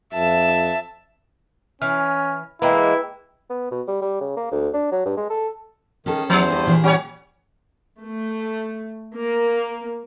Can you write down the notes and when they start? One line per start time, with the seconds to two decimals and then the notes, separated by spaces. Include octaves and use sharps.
0.14 F2 E5 A5
1.82 E3 C#4 F6
2.62 E3 G#3 A#3 E4 B4 G5
3.50 B3
3.71 B2
3.88 G3
4.02 G3
4.21 C#3
4.37 A#3
4.51 D2
4.74 D4
4.92 F#3
5.06 G2
5.17 G#3
5.30 A4
6.06 D#3 C#4 G#4 A4
6.30 E2 F3 C5
6.50 G2 C4
6.66 A#2 E3 G#4
6.84 G3 C#4 F#4 G4 C#5
8.00 A3
9.15 A#3